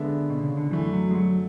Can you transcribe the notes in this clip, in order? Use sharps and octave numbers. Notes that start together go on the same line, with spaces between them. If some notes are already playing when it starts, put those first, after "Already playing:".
Already playing: D3 G#3 B3 D4 A4 E5
B2
C#3
D3
F#2 D3 E3 A3
F#3
G#3
F#3